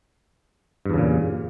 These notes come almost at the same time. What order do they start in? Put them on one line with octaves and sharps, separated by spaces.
G2 E2 C#3 A#2